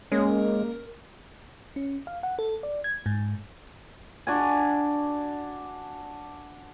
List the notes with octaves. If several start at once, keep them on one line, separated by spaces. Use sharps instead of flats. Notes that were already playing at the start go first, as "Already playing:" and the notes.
G#3 A#3 C#4 A#4
C#4
F5
F#5
A4
D5
G#6
G#2
D4 F#4 G#5